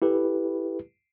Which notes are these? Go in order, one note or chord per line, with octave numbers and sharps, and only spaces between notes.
E4 G4 A4 B4